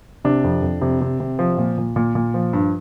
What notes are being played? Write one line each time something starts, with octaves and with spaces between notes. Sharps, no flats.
C3 D4
F2
F2
C3
C3
C3
F3
A#2
A#2
A#2
A#2
F3
G2